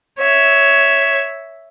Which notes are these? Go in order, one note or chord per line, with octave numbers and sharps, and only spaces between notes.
C#5 E5